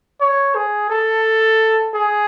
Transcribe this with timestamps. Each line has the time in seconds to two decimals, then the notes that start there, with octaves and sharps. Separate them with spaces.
0.21 C#5
0.55 G#4
0.90 A4
1.95 G#4